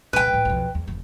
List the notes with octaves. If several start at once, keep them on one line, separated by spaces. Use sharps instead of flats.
D#1 C2 B4 G5
A2 D#4
B1 F2
E2
F1